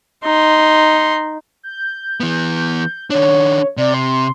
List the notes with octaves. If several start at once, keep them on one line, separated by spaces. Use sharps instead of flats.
D#4 C6
G6
E3 B3
D#3 D4 C#5
C3 D5
C6